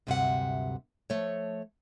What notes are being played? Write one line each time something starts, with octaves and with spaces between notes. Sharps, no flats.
D2 G2 C3 F#3 E5 F#5
F3 A3 C#5